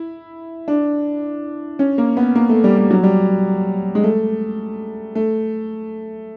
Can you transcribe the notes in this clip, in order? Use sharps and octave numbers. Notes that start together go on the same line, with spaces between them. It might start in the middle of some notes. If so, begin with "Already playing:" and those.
Already playing: E4
D4
C#4
A#3
B3
A#3
A3
G3
G3
F#3
G3
G#3
A3
A3